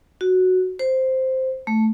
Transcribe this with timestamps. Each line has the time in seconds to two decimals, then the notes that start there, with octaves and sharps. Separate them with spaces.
0.21 F#4
0.79 C5
1.67 A3